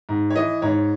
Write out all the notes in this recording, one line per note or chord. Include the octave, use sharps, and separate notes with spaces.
G#2
C#5
E3 D#5
G#2 C#5